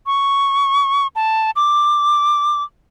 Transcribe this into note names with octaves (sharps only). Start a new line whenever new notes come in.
C#6
A5
D6